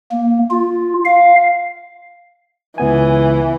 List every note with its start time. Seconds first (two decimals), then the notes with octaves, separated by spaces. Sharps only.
0.11 A#3
0.50 F4
1.05 F5
2.78 C#2 E3 B3 G#5